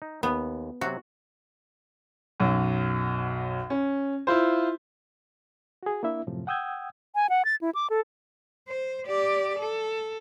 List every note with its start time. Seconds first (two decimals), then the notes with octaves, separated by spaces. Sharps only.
0.02 D#4
0.23 D#2 B3
0.81 C3 F#3 F#4
2.40 B1 F#2
3.70 C#4
4.27 E4 F4 C5
5.83 F#4 G#4
6.03 A#3 D4 E4 E5
6.27 F#2 A2 C3 F3
6.47 F#5 G5 D#6 E6 G6 G#6
7.15 G#5
7.30 F#5
7.45 A6
7.61 E4
7.75 D6
7.90 A4
8.68 C5
9.07 G4 D5
9.59 A4